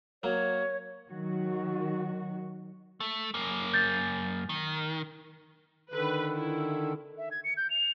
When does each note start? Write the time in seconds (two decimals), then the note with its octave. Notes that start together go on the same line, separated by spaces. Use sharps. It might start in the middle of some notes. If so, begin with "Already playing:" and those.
0.23 F#3 A#3 C#5
1.10 D#3 F#3 F#4
3.00 A3
3.34 F#2 A#3
3.73 G6 A6
4.49 D#3
5.94 D3 D#3 A4 B4
6.36 E4
7.18 E5
7.31 G#6
7.44 C#7
7.57 G6
7.70 F7